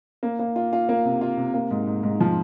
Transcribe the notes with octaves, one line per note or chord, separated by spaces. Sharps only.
A#3
A#3
F4
F4
A#3
C3
F4
C3
A#3
G#2
G#2
G#2
F3